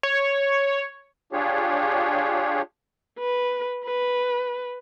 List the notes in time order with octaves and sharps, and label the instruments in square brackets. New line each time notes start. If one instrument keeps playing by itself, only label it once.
[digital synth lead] C#5
[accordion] D4 F4 G4 G#4 C#5
[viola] B4
B4